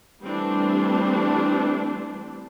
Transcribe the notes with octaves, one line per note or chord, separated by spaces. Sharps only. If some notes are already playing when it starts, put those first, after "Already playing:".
E3 G3 A3 C4 D4